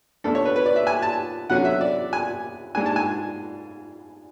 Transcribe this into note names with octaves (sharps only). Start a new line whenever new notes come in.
E2 D3 A3 D4 A4
C#5
B4
B4
D5
E5
G#5
A5
E2 D3 F#3 C#4 F#5
E5
D5
G#5
G#2 G#3 D4 G#5
A5
G#5